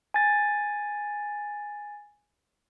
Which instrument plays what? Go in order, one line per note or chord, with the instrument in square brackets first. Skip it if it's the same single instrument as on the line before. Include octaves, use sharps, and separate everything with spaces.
[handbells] G#5 A6